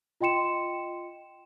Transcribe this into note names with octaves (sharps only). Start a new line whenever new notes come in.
F4 D#5 G5 C6 C#7 E7